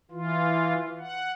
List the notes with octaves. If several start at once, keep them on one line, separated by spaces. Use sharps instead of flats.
E3 F4
F#5